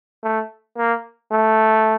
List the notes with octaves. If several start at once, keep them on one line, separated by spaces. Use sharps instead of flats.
A3
A#3
A3